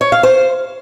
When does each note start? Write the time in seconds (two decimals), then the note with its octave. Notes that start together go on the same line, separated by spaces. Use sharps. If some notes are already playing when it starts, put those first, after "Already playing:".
0.01 C#5
0.12 F5
0.23 C5